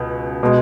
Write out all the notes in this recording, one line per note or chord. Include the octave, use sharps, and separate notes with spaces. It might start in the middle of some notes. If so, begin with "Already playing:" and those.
Already playing: C#2 B2
B2 G#3